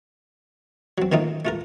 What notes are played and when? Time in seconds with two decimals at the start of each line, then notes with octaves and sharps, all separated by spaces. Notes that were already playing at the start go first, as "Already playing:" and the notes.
0.98 F#3 C4
1.12 D#3 A3 A#3 C4 D#4 F4
1.45 A3 F4 A#4